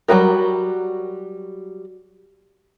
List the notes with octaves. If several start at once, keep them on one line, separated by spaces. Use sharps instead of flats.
F#3 G3 A#3 F#4 A#4